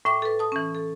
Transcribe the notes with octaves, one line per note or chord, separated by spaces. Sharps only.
A2 E5 G5 D6
A4 B4
A5 D#6
E3 C#4
A4